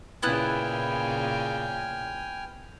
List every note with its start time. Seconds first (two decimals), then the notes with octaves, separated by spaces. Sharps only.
0.23 A#2 C#3 B3 E4 G5 G#5 F6 F#6